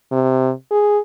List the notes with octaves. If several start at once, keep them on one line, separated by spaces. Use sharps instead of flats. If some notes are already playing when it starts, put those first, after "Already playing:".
C3
G#4